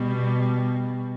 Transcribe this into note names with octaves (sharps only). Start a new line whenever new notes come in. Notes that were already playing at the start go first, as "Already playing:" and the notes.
Already playing: B2 G3